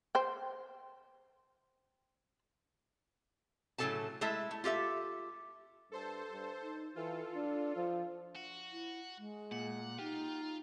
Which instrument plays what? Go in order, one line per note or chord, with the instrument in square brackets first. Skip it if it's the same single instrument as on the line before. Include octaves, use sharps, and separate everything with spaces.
[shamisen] C5 G5
[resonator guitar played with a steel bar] A2 C#3 F#3 A4 G#5 A5
G#3 A3 E4 A4 E5
A3
F4 G4 A4 E5
[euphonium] G2 [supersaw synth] A4 C5 A5
[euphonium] G2
D#4
[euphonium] E3 [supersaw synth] F4 A4
[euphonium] D4
F3
[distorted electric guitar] F#4
[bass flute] E4
G#3
[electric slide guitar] A#2 [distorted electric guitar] F#5
[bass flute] D#4 [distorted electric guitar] F4 [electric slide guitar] G4